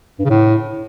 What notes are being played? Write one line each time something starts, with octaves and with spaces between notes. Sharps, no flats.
G2
C#3
A2